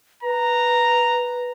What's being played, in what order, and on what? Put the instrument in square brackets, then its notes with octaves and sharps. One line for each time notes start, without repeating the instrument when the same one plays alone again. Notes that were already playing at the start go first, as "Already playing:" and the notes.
[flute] B4 [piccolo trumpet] A#5